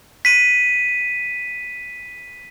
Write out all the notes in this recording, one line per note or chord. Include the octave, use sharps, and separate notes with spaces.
B6 D#7